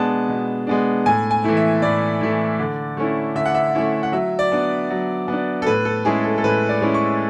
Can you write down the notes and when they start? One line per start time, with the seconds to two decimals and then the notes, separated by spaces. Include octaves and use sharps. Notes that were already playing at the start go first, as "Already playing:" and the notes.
Already playing: B2 G#3 B3 D4 A5
0.28 B2
0.67 G#3 B3 D4
1.06 A2 G#5
1.31 G#5
1.44 E3 A3 E4
1.57 E5
1.82 A2 D5
2.21 E3 A3 E4
2.59 D3
2.97 A3 C#4 E4
3.35 D3 E5
3.46 F#5
3.54 E5
3.75 A3 C#4 E4
4.03 F#5
4.12 F#3 E5
4.39 D5
4.52 B3 D4
4.90 F#3
5.28 B3 D4
5.62 A4
5.67 A2 B4
5.85 A4
6.05 G#3 C#4 E4 G#4
6.24 A4
6.38 A4
6.44 A2 B4
6.69 D5
6.81 G#3 C#4 E4
6.94 C#6